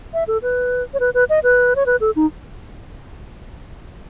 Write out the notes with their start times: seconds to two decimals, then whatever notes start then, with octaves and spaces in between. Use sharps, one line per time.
0.13 E5
0.28 A4
0.42 B4
0.94 C#5
1.00 B4
1.14 B4
1.29 D#5
1.43 B4
1.76 C#5
1.86 B4
2.01 A4
2.16 D#4